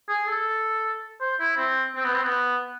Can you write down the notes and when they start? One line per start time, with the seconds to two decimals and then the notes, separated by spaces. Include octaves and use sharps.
0.09 G#4
0.27 A4
1.21 C5
1.40 E4
1.58 C4
1.96 C4
2.05 B3
2.15 C4
2.24 B3